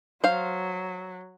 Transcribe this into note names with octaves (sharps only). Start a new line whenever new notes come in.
F#3 C5 F5